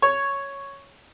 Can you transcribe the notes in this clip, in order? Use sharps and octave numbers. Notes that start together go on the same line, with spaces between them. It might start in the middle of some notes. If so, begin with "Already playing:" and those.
C#5